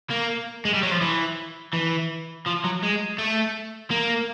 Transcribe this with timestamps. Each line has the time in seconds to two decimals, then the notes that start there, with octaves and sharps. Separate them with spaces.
0.11 A#3
0.65 G#3
0.74 G3
0.83 F#3
0.91 F3
1.01 E3
1.74 E3
2.46 F3
2.64 F#3
2.83 G#3
3.18 A3
3.91 A#3